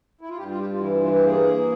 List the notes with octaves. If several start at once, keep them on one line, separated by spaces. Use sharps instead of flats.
E4
F4
G2 G4
F4
G4
F4
E3 E4
F4
G4
A#3 G#4